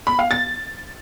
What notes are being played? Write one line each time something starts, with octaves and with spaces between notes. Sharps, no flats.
B5
F5
A6